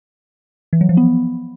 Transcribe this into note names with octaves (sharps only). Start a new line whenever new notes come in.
E3
F#3
F3
B3